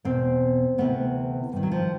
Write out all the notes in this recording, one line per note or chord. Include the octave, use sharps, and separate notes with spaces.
E2 B2 C4
D2 C3 E3 B3
G2 D#3
F#3
F3